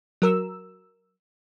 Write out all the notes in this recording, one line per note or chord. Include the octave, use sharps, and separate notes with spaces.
F#3 A#4 E6